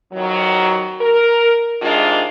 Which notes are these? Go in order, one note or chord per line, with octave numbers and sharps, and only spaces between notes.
F2 D#3 F#3
A#4
C3 D#3 G#3 D4 F4